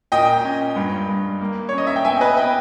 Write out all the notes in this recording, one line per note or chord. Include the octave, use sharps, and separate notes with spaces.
A#2 D#5 G5
C#4
G2
G2
A#3
C#4 C#5
D#5
E5
G5
B3 E5 G#5
B4 D#5
B3 D#5 G5